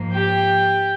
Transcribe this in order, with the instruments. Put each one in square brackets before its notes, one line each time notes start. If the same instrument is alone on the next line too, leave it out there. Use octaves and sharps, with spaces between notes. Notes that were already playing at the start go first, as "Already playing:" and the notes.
Already playing: [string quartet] G#2 F3 A#3
G4 G5